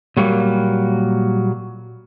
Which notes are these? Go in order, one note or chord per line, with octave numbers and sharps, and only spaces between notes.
A#2 F#3 G3 A#3